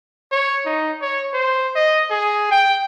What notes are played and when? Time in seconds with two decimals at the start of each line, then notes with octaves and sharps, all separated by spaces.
0.32 C#5
0.66 D#4
1.01 C#5
1.33 C5
1.75 D#5
2.10 G#4
2.51 G5